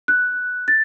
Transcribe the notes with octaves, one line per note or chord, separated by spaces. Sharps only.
F#6
A6